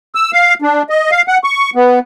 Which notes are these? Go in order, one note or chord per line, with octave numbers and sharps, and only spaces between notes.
E6
F5
D4
D#5
F5
F#5
C#6
B3